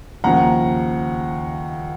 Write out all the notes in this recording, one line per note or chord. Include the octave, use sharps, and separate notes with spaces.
D#2 C#3 F3 F#5 A#5